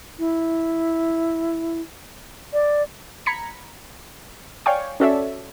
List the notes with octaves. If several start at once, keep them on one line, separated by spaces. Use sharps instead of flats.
E4
D5
A#5 B5 G#6 B6 C#7
C#5 D5 F5 G5 G#5 C#6
C#4 F#4 A4 C#5 D5 E5